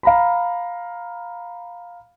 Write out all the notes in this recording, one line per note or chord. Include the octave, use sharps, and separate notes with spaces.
F5 A#5 B5